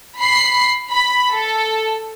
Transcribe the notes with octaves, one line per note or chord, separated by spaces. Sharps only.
B5 C7
B5
A4